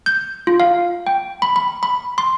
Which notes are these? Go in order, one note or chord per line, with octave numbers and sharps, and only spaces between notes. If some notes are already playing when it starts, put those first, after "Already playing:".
G6
F4
F5
G5
B5
B5
B5
C6